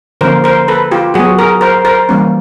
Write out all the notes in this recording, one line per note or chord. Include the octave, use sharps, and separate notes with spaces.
D3 F3 A#3 C#4 A#4 C5
A#4 C5
A4 B4
F4 G4
F#3 B3 F#4 G#4
G#4 A#4
A#4 C5
A#4 C5
E3 G3 A#3 C#4